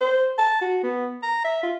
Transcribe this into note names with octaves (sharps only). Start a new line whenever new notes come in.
C5
A5
F#4
B3
A#5
E5
F4